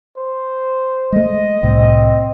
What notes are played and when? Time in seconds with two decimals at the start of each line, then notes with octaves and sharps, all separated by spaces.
0.18 C5
1.12 G#3 A3 D#5
1.63 C2 A2 C4